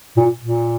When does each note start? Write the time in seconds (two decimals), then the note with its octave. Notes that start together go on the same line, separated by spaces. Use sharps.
0.17 A#2
0.41 A#2